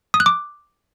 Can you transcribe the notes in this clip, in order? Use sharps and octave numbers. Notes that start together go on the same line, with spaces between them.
D#6
F#6
D6